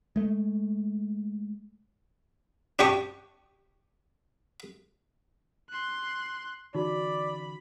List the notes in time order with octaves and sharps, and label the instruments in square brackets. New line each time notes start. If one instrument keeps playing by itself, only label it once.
[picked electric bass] G#3 A3
[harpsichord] D4 G4 C#6 D#6
[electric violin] C6 F#6
[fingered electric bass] D3 E3 C#4 [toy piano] D#4 F#4 G#4 [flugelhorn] D5 [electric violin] B5